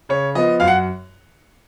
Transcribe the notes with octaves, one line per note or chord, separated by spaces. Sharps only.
C#3 C#5
F3 B3 D#5
F#2 F5
F#5